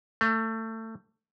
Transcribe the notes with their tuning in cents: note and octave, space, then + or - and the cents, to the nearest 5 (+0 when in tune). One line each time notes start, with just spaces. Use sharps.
A3 +25